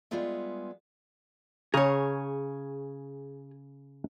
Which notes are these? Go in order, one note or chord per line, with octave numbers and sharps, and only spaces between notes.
G3 G#3 B3 F4 G#4 E5
C#3 G#4 C#5 A#5